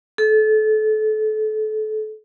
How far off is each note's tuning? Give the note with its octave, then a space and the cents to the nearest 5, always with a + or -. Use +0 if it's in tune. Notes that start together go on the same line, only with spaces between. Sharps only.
A4 -30